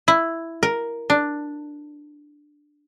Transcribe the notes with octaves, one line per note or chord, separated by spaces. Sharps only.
E4
A#4
D4